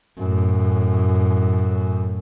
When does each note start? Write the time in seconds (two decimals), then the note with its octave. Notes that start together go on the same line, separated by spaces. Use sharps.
0.18 F#2 A2